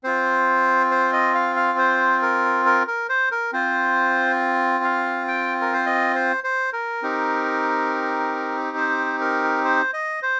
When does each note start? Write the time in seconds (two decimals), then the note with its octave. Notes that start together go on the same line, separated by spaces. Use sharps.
0.04 C4 F4 C5
0.91 C5
1.13 D#5
1.35 F5
1.56 F5
1.78 C5
2.22 A#4
2.66 A#4
2.87 A#4
3.09 C5
3.31 A#4
3.53 C4 F4 C5
4.84 F5
5.28 G5
5.61 A#4
5.73 C5
5.86 D#5
6.15 C5
6.44 C5
6.73 A#4
7.02 C4 D#4 G4
8.77 C5
9.21 A#4
9.65 C5
9.93 D#5
10.22 C5